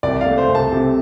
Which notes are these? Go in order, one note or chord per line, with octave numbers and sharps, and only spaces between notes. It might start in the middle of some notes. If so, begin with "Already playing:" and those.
C2 D5
A3 F5
C5
C2
A5
C3